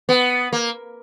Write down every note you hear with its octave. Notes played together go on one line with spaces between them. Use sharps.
B3
A#3